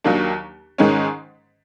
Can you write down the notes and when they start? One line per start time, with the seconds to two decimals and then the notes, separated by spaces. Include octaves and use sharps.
0.04 D#2 D#3 F#3 A#3 D4
0.78 G#2 D#3 G#3 C#4